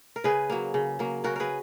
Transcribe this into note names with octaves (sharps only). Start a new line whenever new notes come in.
A#4
C#3 G#4 B4
F#3 A#3
C#3
F#3 A#3
C#3 F#4 A#4
G#4 A#4 B4